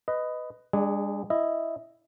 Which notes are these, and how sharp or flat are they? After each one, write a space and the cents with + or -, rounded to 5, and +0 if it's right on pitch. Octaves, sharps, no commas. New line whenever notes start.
B4 +15 D#5 +0
G#3 -45 D4 +0 G#4 +0
E4 +0 D#5 +0